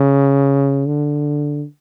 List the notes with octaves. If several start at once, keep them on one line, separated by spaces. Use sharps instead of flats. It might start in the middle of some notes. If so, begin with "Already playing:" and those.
Already playing: C#3
D3